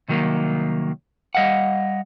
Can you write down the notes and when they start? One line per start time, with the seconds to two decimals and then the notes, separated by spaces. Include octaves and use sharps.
0.08 C2 D#3 F#3 A3 A#3
1.35 G3 D#5 F5 F#5